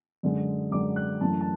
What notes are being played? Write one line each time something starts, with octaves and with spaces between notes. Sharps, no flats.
F#2 D3 G#3
F#2 D3 G#3 D6
F#6
F#2 E3 A3 A5
A5